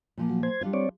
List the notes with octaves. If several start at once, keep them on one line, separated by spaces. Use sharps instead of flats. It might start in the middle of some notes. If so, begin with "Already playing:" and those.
A#2 F3 A#3
F#3
C5 G#6
G3 D4 F4
C4 C#5 D5